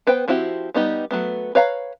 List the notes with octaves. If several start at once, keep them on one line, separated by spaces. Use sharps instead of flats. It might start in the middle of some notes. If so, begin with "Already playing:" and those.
B3 B4 C5 G5
F3 C4 E4 F#4 G4
G3 B3 D#4 G4
F#3 A3 B3
B4 C#5 F5 A5 A#5